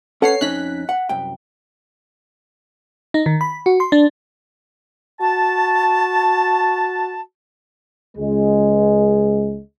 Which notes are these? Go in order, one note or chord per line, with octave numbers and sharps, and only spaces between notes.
C#4 A4 B4 C#5 F#5 C7
F2 C#4 D#4 F#6 B6
F#5
C2 F#2 G5
D#4
D#3
B5
F#4
C6
D4
F#4 A5
C#2 G#3